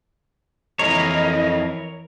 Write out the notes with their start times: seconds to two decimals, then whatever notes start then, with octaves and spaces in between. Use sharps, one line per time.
0.79 F2 E3 C4 E4 A#4 C#5 D#5 A#5